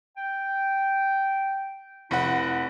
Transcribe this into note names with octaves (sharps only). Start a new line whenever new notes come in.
G5
F1 E4 F#5